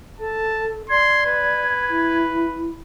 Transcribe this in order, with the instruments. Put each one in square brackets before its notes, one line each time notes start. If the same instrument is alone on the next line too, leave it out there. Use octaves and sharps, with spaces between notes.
[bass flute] A4 [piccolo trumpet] A5
[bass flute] D5 [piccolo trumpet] C6 [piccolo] G#6
[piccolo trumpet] B4
[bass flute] E4